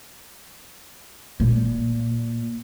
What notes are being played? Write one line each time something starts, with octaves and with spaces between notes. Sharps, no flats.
A#2